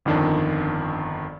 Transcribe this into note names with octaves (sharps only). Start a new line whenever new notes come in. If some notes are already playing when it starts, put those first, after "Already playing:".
G1 F2 D#3 D4